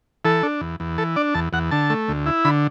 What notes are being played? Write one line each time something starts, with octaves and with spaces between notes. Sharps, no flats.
E3 A4
D4
E2
E2
E3 A4
D4 D5
E2 A5
E2 F#5
D3 A5
A3
D2
E4
D3 B5